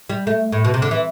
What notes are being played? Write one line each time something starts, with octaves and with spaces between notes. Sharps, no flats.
G3
A3
A2
B2
C3
D3
E3